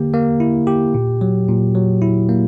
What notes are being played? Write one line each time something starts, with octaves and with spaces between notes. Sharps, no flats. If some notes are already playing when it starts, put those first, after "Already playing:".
Already playing: D3 A#3 G4
A#3
E4
G4
A#2
F#3
A#2
F#3
E4
A#3